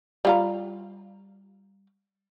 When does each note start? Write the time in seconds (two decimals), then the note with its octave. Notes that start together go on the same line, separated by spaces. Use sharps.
0.25 G3 F4 A#5